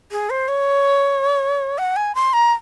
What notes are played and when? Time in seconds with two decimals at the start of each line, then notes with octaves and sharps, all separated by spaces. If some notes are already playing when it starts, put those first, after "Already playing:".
0.11 G#4
0.30 C5
0.48 C#5
1.78 F#5
1.96 G#5
2.15 C6
2.33 A#5